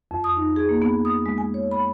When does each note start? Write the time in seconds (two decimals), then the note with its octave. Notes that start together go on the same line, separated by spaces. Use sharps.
0.11 F2
0.24 D#6
0.37 D#4
0.56 G#4
0.69 A#3
0.82 B3
1.05 D#6
1.26 G#3
1.38 G#5
1.54 C#5
1.71 B5